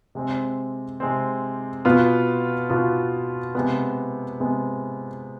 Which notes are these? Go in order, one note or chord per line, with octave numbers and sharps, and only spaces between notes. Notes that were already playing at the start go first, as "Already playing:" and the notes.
C3 G#3 C4
C3 G#3 C4
B2 B3 F4
B2 B3 F4
C3 G#3 B3
C3 G#3 B3